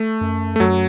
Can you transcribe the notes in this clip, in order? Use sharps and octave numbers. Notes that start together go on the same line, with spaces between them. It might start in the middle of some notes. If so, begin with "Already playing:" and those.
Already playing: A3
F#2
A3
F#2 F#3